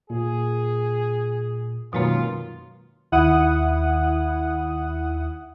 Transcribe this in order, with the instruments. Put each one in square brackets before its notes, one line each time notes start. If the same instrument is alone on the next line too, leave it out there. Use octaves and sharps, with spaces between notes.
[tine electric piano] A#2 [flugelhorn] G#4
[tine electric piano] F#2 D#3 F#3 [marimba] B2 G#3 A#3 [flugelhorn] F4
[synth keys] D#2 E4 F#5 D#6